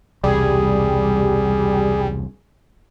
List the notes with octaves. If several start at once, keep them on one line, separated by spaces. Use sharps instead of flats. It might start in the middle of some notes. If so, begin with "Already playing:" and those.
E1 C2 G3 G#4